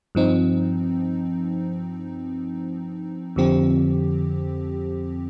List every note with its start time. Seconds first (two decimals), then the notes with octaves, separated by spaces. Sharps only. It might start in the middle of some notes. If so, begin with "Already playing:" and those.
0.15 G2 F3 C4 D#4
3.36 F2 D3 F3 C4 G4